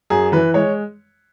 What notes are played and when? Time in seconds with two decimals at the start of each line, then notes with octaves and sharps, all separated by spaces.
0.10 F#2 G#4
0.32 E3 B4
0.54 G#3 C#5